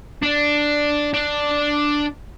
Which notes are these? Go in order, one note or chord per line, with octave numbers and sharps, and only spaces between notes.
D4
D4